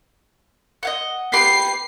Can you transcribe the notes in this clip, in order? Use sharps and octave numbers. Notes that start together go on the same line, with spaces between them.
D#5 F5 F#5
G4 B4 C7